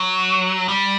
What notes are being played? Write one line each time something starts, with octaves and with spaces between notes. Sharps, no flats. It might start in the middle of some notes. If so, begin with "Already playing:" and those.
Already playing: F#3
G3